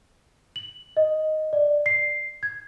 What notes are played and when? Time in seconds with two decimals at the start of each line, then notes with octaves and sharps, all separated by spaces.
0.56 F#7
0.97 D#5
1.53 D5
1.86 C7
2.43 G#6